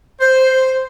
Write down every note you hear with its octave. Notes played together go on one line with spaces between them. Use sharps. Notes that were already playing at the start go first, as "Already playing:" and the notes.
C5